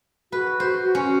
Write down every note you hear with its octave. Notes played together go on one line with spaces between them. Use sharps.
F#4 B4
C5
C#4